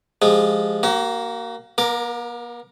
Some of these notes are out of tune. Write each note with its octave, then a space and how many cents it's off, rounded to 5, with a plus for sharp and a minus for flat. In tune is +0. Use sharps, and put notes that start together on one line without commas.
F3 +0 G#3 +0 G4 +20
A#3 +0 F#4 +40
A#3 +45 A#4 +0 D6 +10